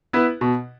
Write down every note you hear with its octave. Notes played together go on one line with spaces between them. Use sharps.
B3 E4 B4
B2